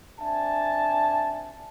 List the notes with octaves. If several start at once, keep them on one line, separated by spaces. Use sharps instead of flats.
C4 D4 E5 G#5 A5